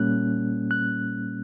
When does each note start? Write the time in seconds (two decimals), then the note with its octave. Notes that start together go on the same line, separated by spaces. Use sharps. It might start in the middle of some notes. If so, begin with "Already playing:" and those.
Already playing: A#2 G3 A#3 C#4 F#6
0.71 F#6